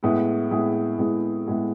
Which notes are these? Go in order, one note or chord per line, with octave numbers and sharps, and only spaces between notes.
A2 G#3 B3 E4 G#4
A2 G#3 B3 E4 G#4
A2 G#3 B3 E4 G#4
A2 G#3 B3 E4 G#4